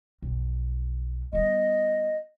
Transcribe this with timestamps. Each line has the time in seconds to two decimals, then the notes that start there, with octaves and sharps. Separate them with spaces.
0.22 B1 F2
1.33 G3 B3 D#5